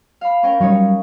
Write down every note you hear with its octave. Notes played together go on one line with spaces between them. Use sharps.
F5 B5
C#4 A#4 G5
F#3 G3 C#4 D#4 C#5